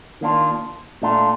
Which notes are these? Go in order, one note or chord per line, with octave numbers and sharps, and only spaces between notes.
D#3 A#3 D4 F4
A#2 A3 D4 F4